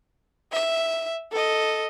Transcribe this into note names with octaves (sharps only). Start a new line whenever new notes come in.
E5
A4 D#5